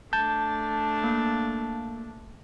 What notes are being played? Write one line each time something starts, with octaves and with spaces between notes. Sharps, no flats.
A3 D4 A5 G6
A#3